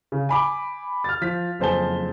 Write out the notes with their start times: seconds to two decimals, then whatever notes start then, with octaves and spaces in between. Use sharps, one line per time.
0.12 C#3
0.29 G#5 B5 D6
1.04 F6 A6
1.21 F3 B6
1.59 F#1 F2 C5 G#5 A5 G7